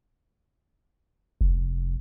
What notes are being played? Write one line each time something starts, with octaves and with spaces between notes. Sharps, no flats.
F1